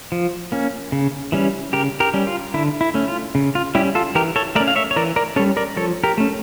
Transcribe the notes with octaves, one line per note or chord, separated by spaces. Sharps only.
F3
A#3 C#4
C#3
E3 G3 C#4
C#3 G4 A#4
G4 A#4
G3 C#4
F4
D3 E4
E4
A3 C#4
F4
C#3
F4
G3 C#4 E4 G4
F4 A4
E3 G4 A#4
A4 C#5
A3 C#4 A#4 D5
F5
C#5 E5
C#5
E3 A#4 D5
A#4 D5
G3 C#4 A4 C#5
A#4 D5
F3 A4 C#5
G4 A#4
A3 C#4